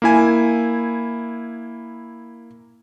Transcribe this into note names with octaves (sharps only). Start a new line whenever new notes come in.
A#3 E4 G#5